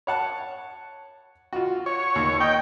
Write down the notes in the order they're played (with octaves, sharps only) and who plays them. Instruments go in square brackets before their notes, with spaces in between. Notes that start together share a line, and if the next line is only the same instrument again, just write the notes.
[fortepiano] C#5 F#5 A5
F4 F#4
[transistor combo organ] C#5
[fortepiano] D#2
[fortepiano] D#5 [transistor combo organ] G5